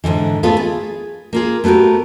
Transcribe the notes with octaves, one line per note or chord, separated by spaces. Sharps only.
G#2 B2 D3 E3
A3 B3 F4 G#4 A4
G#4
A#3 F4 G#4
A3 B3 F#4 G4 A#4